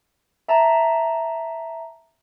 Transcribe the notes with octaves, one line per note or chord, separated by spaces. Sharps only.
E5 A5 A#5